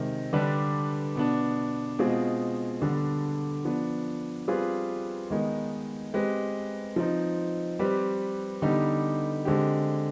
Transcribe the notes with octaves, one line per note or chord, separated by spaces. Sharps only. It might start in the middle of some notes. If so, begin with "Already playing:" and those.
Already playing: C3 D#3 G#3 C4
D3 G3 D4 G4 B4
B2 B3 D4
B2 G#3 C4 F4 G#4
D3 G3 B3 D4
F3 B3 D4
G3 C4 F4 G#4 B4
D#3 G#3 B3 D#4
G#3 C4 G4 B4
F3 C4 D#4
G3 C4 G4 B4
D3 G3 B3 D#4 G4
D3 G#3 C4 G4